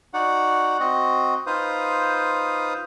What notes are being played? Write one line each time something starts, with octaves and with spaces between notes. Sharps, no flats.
D#4 F#4 D5 F#5
C4 F#4 D#5
D#4 F4 B4 C5 F5 D#6